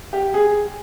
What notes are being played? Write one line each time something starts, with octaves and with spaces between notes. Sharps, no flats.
G4
G#4